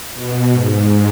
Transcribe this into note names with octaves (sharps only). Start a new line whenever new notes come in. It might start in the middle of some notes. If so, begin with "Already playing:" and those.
B2
G#2